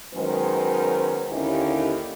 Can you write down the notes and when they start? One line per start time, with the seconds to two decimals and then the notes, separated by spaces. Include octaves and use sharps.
0.14 D#3 F#3 G#3 B3 C#4 C5
1.31 D#2 D3 C#4 D#4 E4 G4